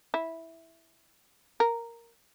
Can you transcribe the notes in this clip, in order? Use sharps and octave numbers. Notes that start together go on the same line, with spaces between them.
E4
A#4